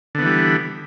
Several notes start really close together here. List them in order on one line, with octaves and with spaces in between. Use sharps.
D3 B3 E3 G3